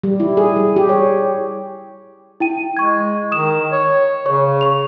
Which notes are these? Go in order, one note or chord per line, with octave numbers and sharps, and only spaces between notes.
G3
E4
G#4
G3
G4
C#5
E4 G5 D#7
G#3 C#6 G#6
D#3 D#6 E7
C#5
C#3 C#5 C#6
C#6 F7